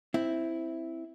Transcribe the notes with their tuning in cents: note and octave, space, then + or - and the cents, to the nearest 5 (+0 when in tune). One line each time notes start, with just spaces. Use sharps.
C4 +0 E4 +0